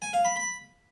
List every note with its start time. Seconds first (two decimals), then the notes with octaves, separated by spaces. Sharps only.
0.02 G#5
0.13 F5
0.25 B5
0.36 B5